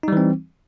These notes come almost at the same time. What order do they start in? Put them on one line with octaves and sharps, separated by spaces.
D#4 G3 E3 C4